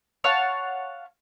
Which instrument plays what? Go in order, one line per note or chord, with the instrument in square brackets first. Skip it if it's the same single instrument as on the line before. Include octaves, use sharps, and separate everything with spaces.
[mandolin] C#5 F5 F#5 A5